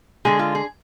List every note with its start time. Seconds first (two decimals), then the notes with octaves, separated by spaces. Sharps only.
0.25 D3 G#3 G#4
0.39 F4
0.55 G#4